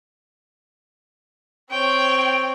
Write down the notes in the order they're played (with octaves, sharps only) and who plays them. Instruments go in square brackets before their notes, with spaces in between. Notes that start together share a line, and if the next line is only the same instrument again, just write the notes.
[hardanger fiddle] C4 C#5 [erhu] G5